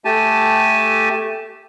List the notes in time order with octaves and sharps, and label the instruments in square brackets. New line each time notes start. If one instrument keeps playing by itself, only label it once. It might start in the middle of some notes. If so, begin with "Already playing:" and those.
[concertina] A3 G4 G#5 A5